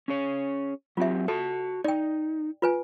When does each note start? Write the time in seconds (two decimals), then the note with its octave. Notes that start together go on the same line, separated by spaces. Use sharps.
0.08 C#4 G#4 C#5
0.97 F#3 C4 F4 G4 E5
1.28 F#4 A4 A5
1.84 D#4 D5 G5
2.62 F4 B4 G#5